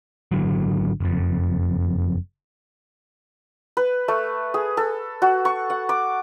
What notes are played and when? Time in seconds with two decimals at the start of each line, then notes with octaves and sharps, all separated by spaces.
0.32 G#1 D3 F#3
1.00 F#1 F2
3.77 B4
4.08 A3
4.54 G#4
4.77 A4
5.22 F#4
5.45 C#6
5.70 F#5
5.89 D6